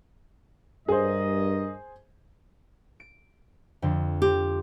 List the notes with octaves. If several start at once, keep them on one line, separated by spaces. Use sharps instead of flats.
G2 G#4 A#4 C5 D#5
D7
F2 D3
C4 G4